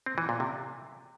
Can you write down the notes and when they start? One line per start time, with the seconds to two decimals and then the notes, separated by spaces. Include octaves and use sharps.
0.06 C4
0.18 E3
0.29 A#2
0.40 C3